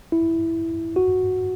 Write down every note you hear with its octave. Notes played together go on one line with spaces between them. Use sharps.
E4
F#4